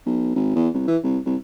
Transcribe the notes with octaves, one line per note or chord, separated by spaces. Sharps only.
B1
G#1
E2
C2
E3
C2
C2